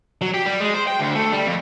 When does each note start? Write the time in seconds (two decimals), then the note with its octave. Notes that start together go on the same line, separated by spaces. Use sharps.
0.21 F#3
0.34 G4
0.46 G3
0.60 G#3
0.74 C5
0.87 G5
0.99 D2
1.15 A3
1.32 G3
1.46 F2